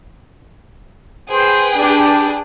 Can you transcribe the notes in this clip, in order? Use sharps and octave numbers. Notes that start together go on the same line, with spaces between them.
G#4 B4 C5 G5
D4 G4